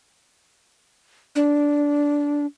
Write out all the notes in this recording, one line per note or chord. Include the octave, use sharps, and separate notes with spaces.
D4